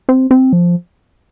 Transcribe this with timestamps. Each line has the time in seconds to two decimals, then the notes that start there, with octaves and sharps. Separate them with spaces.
0.09 C4
0.31 C4
0.53 F3